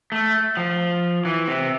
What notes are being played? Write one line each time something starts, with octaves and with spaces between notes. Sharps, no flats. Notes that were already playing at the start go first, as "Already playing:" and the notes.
A3
F3
E3
C3